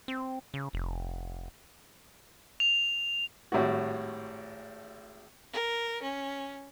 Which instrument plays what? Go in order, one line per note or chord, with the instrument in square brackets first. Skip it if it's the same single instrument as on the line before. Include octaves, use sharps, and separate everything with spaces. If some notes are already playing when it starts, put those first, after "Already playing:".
[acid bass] C4
C#3
F1
[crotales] F7
[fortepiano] G#1 A2 G3 F#4
[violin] A#4
C#4